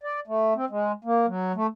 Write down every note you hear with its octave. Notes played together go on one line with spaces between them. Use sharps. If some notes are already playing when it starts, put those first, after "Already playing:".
D5
A3
C4
G#3
A#3
F#3
A3